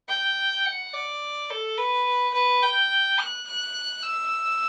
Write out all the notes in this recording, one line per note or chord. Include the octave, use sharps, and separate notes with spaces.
G5
F#5
D5
A4
B4
B4
G5
F#6
F#6
E6